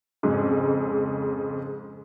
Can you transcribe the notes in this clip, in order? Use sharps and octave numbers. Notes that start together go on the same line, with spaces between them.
F2 G#2 C#3